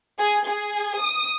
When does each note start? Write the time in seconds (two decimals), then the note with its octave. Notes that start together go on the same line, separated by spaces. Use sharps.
0.19 G#4
0.49 G#4
1.01 D#6